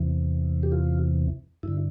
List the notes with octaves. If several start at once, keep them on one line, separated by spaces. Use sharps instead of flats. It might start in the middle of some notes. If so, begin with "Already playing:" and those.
Already playing: E2 C3 E3
G4
F4
G2 D3 E4